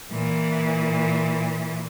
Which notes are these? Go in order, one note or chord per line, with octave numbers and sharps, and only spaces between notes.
A#2 E3